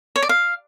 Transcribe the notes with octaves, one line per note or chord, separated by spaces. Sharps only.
C#5
D5
F5